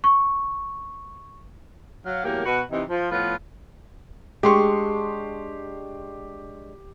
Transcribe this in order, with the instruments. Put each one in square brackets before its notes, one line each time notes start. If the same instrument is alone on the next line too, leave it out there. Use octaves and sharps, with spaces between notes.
[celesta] C#6
[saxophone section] F#3 F5
E2 A2 F#3 A#3 G4 A#4
B2 F#4 B4
C3 E3 D#4
F3
A2 F3 B3 F4 B4 C#5
[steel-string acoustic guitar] G#3 D4 [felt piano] G4 C6 C#6